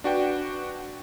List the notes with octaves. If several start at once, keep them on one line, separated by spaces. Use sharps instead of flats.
D4 F#4 B4 G5